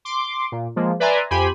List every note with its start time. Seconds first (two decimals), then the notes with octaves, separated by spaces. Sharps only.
0.05 C6 D6
0.52 A#2
0.76 F3 G#3 A#3
1.00 B4 D5 E5 G#5 A#5 C6
1.31 F2 G4 G#5 B5 C6